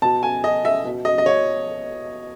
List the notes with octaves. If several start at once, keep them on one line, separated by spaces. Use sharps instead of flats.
B2 A5
G#5
D#5
E5
B2
D#5
D#5
C#5